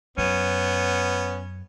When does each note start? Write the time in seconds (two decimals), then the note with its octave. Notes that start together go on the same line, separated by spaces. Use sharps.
0.18 F#2 B3 C#4